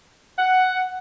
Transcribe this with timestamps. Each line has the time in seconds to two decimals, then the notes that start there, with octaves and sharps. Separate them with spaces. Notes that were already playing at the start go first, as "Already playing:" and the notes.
0.37 F#5